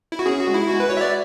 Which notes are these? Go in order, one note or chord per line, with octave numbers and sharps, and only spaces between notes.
E4
F#4
C#4 G#4
F#4
G#3
E4
G#3 F#4
B4
F#4 C#5
E5
D5